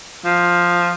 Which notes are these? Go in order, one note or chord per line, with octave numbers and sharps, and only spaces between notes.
F3